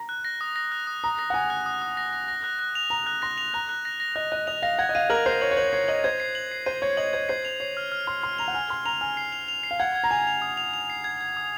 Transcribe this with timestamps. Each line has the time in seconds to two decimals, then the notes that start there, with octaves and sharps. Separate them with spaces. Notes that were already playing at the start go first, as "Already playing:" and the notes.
Already playing: A#5
0.09 F#6
0.25 A#6
0.41 D#6
0.56 A#6
0.72 F#6
0.87 D#6
1.04 A#5 D#6
1.19 A#6
1.30 F#5
1.34 G#5 D#6
1.50 F#6
1.66 D#6
1.82 D#6
1.97 A#6
2.13 A#6
2.28 A#6
2.44 F#6
2.59 F#6
2.75 F7
2.90 A#5 F7
3.06 F#6
3.22 C6 A#6
3.38 F7
3.54 A#5 F#6
3.69 F#6
3.85 A#6
4.00 A#6
4.16 D#5 F#6
4.32 D#5 F#6
4.47 D#5 F7
4.62 F5 A#6
4.79 F#5 G#6
4.89 D#5
4.95 F5 D#7
5.10 A#4 F#7
5.26 C5 C7
5.41 C#5 F#7
5.51 C#5
5.57 C5 F#7
5.72 C#5 C7
5.88 D#5 F#7
6.04 C5 G#6
6.20 C7
6.35 F#7
6.51 C7
6.66 C5 D#7
6.82 C#5 G#6
6.97 D#5 F#7
7.13 C5 G#6
7.29 C5 C7
7.45 F7
7.60 C#5 C7
7.77 F6
7.92 F6
8.07 C6 F6
8.23 C6 F6
8.38 A#5 F7
8.48 F#5
8.54 G#5 F6
8.70 C6 F6
8.85 A#5 F7
9.01 G#5 F6
9.17 C7
9.32 F7
9.48 F7
9.63 C7
9.71 F5
9.80 F#5 G#6
9.96 G#6
10.04 A#5
10.11 G#5 F7
10.27 F7
10.42 D#6
10.57 F7
10.74 F7
10.90 C7
11.04 G#6
11.21 G#6
11.37 D#6